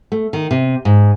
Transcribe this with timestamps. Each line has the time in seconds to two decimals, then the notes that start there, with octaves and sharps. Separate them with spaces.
0.12 A3
0.33 D#3
0.51 C3
0.85 G#2